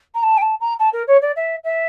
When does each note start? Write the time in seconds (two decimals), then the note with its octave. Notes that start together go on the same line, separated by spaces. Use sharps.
0.15 A#5
0.23 A5
0.38 G5
0.42 A5
0.61 A#5
0.79 A5
0.93 A#4
1.08 C#5
1.22 D5
1.36 E5
1.64 E5